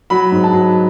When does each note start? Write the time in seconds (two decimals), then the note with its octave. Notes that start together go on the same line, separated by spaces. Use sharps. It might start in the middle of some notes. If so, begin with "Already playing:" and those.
0.10 F#3 B5
0.32 G#2
0.44 A5
0.53 F#3